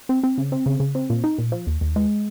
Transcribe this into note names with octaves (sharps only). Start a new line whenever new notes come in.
C4
C4
C#3
C4
C#3
C#3
C4
A#2
D#4
A#2
F3
D#2
D#2
G#3